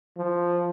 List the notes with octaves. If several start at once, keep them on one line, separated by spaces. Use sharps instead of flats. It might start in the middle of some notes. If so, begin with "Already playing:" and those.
F3